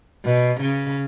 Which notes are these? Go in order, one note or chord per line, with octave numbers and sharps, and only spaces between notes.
B2
C#3